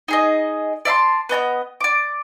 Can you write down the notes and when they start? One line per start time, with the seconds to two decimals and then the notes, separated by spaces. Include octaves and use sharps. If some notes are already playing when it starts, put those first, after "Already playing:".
0.08 D#4 G#4 D#5
0.85 D5 E5 A5 C6
1.29 B3 D#5 A5 G6
1.81 D5 D6